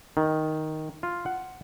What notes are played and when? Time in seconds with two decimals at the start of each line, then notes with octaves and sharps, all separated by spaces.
0.17 D#3
1.03 F4
1.26 F#5